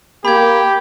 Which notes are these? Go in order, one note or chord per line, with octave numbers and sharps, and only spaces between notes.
A#3 G4 B5 G#6